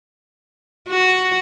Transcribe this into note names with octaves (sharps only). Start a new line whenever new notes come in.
F#4